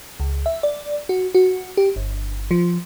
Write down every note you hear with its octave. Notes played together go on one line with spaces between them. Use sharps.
C#2
E5
D5
F#4
F#4
G4
G1
F3